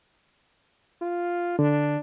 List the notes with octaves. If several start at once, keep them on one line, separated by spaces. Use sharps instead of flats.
F4
D3 D4